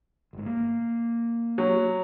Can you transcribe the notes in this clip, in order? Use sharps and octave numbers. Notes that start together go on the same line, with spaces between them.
G1 G#2
A#3
F#3